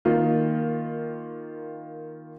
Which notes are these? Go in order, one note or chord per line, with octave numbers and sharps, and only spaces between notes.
D#3 A#3 F4